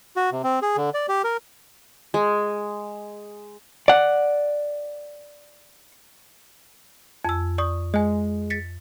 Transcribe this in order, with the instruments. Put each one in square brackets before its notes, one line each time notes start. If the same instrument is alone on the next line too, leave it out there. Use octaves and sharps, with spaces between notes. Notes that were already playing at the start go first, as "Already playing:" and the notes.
[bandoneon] F#4
C3
C4
G#4
D3
D5
G4
A#4
[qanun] G#3
[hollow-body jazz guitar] D5 F#5
[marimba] F2 [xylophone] G#5 E6
[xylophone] D5 C#6 D#6
[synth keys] G#3 [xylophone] D#5 G#5
[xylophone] A6 B6 C#7